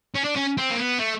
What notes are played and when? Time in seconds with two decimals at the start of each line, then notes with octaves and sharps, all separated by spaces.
0.15 C#4
0.25 D4
0.36 C#4
0.58 C4
0.71 A#3
0.78 B3
0.99 A3